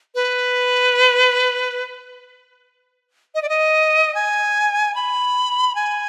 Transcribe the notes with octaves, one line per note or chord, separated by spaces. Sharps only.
B4
D#5
D5
D#5
G#5
B5
G#5